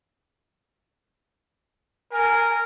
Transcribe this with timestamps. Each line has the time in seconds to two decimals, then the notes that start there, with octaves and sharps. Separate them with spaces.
2.13 A#4 G#5